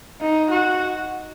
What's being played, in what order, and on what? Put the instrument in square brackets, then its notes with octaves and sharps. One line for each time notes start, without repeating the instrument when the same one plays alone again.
[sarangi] D#4
F#4